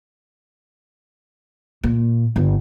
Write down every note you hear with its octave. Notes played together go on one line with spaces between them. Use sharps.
A#2
G1